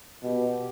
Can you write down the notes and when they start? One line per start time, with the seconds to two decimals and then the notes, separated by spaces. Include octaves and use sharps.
0.23 B2 G4